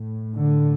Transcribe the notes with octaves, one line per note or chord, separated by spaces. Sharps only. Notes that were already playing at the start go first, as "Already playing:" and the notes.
Already playing: A2
D3